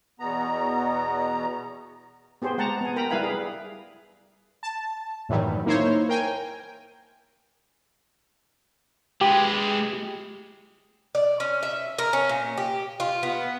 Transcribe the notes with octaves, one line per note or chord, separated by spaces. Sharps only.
E2 B2 B3 A#5
B3 G4 G#4 C5
G#3 F#5 A5 A#5
B3 G#5
A#4 G5 A#5 B5
G3 E4 B4 F5 G#5 B5
G#4
A5
F#2 A2 D#3 E3 F#3 G3
A#3 D#4 E4 C5 C#5
A#4 G5 G#5
G#3 G4 B4
D5
C#4
E5
A#4
C#4
A#2
G4
F4
B3